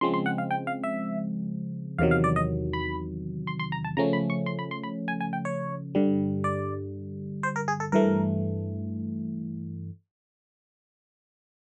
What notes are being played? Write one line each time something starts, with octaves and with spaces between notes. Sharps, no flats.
C#3 F3 G#3 C4 C6
C6
F#5
F5
G5
F5
E5
E2 C3 D#3 F#3 F5
F5
D5
D#5
B5
C6
C6
A#5
A5
C#3 F3 A3 C#4 A#5
B5
C#6
C6
B5
C6
B5
G#5
G#5
G5
C#5
G2 D3 G3
D5
C5
A#4
G#4
A4
G2 E3 A3 A#4